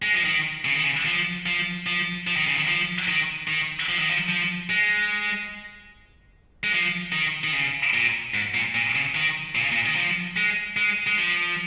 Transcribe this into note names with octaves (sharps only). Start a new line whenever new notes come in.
G#3
F3
D#3
C#3
D#3
C#3
F3
F3
F3
F3
D#3
C#3
D#3
F3
D#3
D#3
F3
D#3
F3
F3
G#3
G#3
F3
D#3
D#3
C#3
A#2
G#2
A#2
A#2
C#3
D#3
A#2
C#3
A#2
D#3
F3
G#3
G#3
G#3
F3